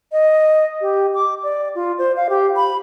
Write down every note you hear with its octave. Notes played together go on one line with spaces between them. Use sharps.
D#5
G4
D6
D5
F4
C5
F5
G4
B5